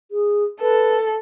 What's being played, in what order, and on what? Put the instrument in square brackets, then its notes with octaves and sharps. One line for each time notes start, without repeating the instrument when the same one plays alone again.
[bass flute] G#4
[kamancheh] A4 [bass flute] B4